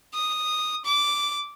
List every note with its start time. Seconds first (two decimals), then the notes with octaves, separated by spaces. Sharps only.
0.14 D#6
0.85 D6